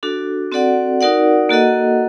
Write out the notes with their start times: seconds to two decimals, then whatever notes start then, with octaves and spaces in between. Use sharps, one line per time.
0.03 D4 F#4 A4
0.52 C4 F#4 A4 D5 F#5
1.01 D#4 F#4 A#4 D5 F#5
1.49 A#3 F#4 A4 D#5 F#5